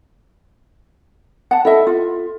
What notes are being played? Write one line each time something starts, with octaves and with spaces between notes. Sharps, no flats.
F#5 A5
E4 A4 D#5 E5
F4